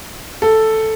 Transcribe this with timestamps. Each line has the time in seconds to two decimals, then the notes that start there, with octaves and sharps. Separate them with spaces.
0.42 A4